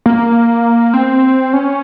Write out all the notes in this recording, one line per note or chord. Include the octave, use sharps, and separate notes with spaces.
A#3
C4
C#4